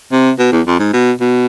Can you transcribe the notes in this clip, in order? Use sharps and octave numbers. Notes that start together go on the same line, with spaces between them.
C3
B2
E2
F2
G#2
B2
B2